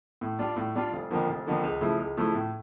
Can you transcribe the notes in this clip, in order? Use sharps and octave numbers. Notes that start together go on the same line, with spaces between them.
A2
G3 D4 F4
A2
G3 D4 F4
F1
F2 D3 F3 A#3
F1
F2 D3 F3 A#3
C#2
C#3 F3 A3 E4
C#2
C#3 F3 A3 E4
A2